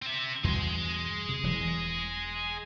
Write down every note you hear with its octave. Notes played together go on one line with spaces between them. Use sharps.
C4 E5
E2 G2 B2 G#4 C6
C3
E1 E3 F#3